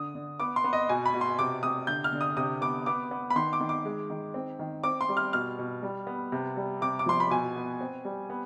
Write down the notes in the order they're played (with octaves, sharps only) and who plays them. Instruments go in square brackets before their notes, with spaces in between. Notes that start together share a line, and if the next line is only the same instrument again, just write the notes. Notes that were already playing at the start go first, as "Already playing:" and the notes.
Already playing: [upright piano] D3 D#6
D3
B3 D6
C6
B3
D#5
B2 G#5
B5
B2
C6
C3 D6
C3 D#6
D3 G6
F6
D3
D#6
C3 D#6
B3 D6
B3 D6
B3
B5
D#3 C6
D6
D#3
D6
G#3
D#3
C4
D#3
C4 D6
C6
G3
F6
B2 F6
B2
G3
B3
C3
G3
C3 D6
D6
F3 C6
B5
B2 G#5
B3
C4
G3
B3